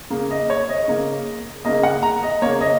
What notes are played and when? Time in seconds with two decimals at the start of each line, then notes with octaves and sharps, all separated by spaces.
0.10 C#3 A#3
0.31 D#5
0.50 C#5
0.69 D#5
0.88 C#3 A#3
1.65 C#3 A#3 D#5
1.83 F#5
2.03 A#5
2.23 D#5
2.42 C#3 A#3 C#5
2.61 D#5